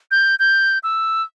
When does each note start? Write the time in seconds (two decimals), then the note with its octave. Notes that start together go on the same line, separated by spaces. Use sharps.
0.11 G6
0.39 G6
0.83 E6